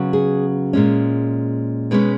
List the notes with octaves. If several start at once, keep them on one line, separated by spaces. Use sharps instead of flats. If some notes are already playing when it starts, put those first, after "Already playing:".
Already playing: C#3 F#3 B3
G#4
A#2 G#3 C#4
B2 G#3 C#4 B4